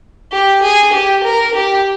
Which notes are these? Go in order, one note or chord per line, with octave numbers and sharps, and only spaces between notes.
G4
G#4
G4
A#4
G4